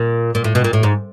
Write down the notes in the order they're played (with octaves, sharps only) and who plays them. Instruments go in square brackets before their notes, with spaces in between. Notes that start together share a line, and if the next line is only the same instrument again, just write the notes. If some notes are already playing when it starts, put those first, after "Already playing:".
Already playing: [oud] A#2
A#2
A2
B2
A#2
A2
G#2